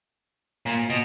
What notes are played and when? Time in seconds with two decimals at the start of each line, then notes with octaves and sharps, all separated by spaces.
0.66 A#2
0.90 B2